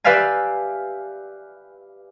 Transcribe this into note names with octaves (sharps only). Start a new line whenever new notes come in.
G4 B4 D5 E5 F5 G#5